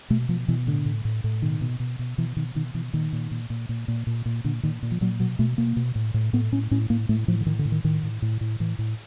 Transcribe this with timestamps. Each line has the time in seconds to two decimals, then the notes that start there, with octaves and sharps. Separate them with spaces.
0.10 B2 A3
0.29 B2 F3
0.48 B2 E3
0.67 A2 D3
0.86 A2
1.05 A2
1.24 A2
1.42 B2 D#3
1.61 B2
1.80 B2
1.99 B2
2.18 B2 E3
2.37 B2 D#3
2.55 B2 D#3
2.74 B2 E3
2.93 A#2 D#3
3.13 A#2
3.31 A#2
3.50 A#2
3.69 A#2
3.88 A#2
4.07 A#2
4.26 A#2
4.44 A#2 D3
4.63 A#2 D#3
4.83 A#2
4.91 F3
5.01 A#2 F#3
5.20 B2 F#3
5.39 B2 A3
5.58 B2 A#3
5.76 B2
5.95 A2
6.14 A2
6.33 A2 B3
6.52 A2 C#4
6.71 A2 C#4
6.90 A2 A#3
7.09 A2 A3
7.28 A2 F3
7.41 D3
7.46 A2 D#3
7.59 D3
7.65 A2
7.72 D#3
7.84 A2 D#3
8.03 A2
8.22 A2
8.41 A2
8.60 A2 E3
8.79 A2